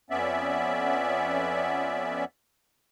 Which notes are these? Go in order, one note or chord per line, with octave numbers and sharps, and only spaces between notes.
F2 B3 C#4 D5 E5